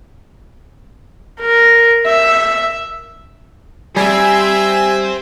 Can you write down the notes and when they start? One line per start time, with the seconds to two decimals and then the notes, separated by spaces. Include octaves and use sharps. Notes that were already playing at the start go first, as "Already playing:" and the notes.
1.41 A#4
2.07 E5
3.96 G3 C5 E5 G5 G#5